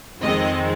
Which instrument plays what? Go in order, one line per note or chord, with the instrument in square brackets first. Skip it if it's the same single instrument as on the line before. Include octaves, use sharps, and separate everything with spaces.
[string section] F2 D#3 G#3 C4 D#5